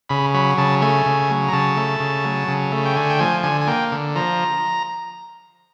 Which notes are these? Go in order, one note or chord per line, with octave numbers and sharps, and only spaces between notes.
C#3 B5
F#3 B5
C#3 A5
A3 G#5
C#3
F#3
A#5
C#3 A5
A3
C#3
F#3
C#3
A3
G5
D3 G#5
G5
F3 G#5
D3 G#5
G#5
A#3 G5
D3
F3 A#5